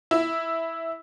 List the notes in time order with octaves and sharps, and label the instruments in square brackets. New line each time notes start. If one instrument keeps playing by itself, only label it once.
[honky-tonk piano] E4